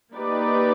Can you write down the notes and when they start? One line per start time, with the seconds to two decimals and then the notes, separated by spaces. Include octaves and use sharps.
0.13 A#3 D#4 G4 B4 D5